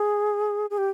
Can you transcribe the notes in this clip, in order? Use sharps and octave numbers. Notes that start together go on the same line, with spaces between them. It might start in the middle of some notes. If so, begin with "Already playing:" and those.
Already playing: G#4
G#4
G4